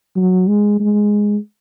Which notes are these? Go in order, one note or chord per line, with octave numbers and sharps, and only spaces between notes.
F#3
G#3
G#3